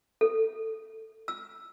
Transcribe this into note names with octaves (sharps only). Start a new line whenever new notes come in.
A4
E6